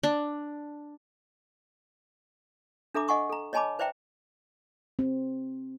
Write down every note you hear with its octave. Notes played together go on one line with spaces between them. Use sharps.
D4
D4 A4 E5 A#5 D6
D#5 F#5 G#5 C#6 D#6
A4 A#5
C#5 D#5 G#5 A5 B5 D6
B4 C5 D5 E5 G5 A#5
C4